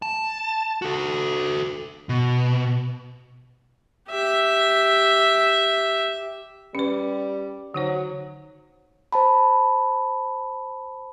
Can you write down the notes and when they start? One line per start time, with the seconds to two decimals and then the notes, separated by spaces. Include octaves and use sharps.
0.02 A5
0.82 F#4 A4
2.09 B2
4.10 G4 E5
6.75 G3 C#4 B4
7.74 D3 F#3 D#4 C5
9.13 C5 A5 B5